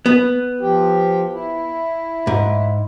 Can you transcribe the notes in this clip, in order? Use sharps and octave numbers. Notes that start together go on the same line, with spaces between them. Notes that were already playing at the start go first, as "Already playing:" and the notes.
B3
F3 G4
E4
G#2